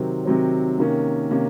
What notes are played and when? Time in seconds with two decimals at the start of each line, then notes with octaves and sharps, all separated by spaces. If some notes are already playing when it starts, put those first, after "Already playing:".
Already playing: C3 D#3 F#3 C4
0.25 C3 D#3 F#3 C4
0.79 C3 D#3 A#3 C#4
1.31 C3 D#3 A#3 C#4